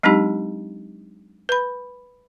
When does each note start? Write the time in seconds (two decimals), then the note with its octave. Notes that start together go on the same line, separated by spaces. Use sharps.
0.03 F#3 G#3 C4 D4 D#4 G4
1.49 B4 B5